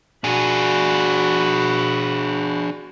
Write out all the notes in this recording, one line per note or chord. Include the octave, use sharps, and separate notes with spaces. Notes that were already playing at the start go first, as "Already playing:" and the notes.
D4 F#4 G#4 B5